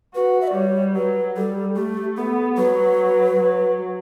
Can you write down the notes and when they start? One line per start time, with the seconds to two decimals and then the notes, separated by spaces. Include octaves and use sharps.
0.15 F#4 B4
0.41 E5
0.48 D5
0.55 G3 C#5
0.95 F#3 B4
1.37 G3 A4
1.76 A3 G4
2.17 B3 A4
2.57 F#3 B4
3.39 F#3